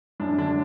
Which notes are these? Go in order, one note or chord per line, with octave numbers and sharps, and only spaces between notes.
F#2 D4
D3 D4